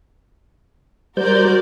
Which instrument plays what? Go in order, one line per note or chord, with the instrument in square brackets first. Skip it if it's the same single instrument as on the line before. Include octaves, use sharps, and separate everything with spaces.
[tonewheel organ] G3 C5 G6 [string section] F#4 A#4 D5